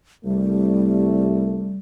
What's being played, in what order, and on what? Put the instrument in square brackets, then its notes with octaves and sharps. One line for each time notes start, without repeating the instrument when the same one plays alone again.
[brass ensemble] C2 A3 [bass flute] G3